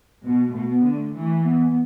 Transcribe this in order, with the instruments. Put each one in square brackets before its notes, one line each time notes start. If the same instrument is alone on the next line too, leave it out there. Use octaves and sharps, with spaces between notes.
[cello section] B2 [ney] B3
[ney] A3
[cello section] B2
[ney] B3
[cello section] D3
[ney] A3
[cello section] E3 [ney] A3
[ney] A3
B3
B3